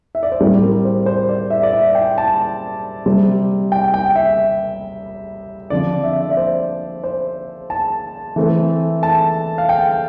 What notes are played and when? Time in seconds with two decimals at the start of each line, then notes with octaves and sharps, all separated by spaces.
0.15 E5
0.23 D5
0.32 C5
0.40 A2 G3 C4 A#4
0.62 A#4
0.85 C5
1.06 C5
1.29 D5
1.50 E5
1.63 D5
1.73 E5
1.95 G5
2.18 A5
3.06 C3 G3 C4
3.72 G5
3.94 G5
4.16 E5
5.70 D3 F3 C4 D5
6.04 E5
6.23 E5
6.30 D5
6.37 C5
7.04 C5
7.70 A5
8.36 E3 A3 C4
9.03 A5
9.58 F5
9.69 G5